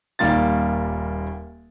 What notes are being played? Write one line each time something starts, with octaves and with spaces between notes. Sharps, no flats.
D#1 D#3 G3 A#3 F4 A6